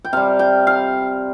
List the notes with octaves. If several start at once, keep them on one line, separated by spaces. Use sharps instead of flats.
G5
C3 G3 F5
G5
F5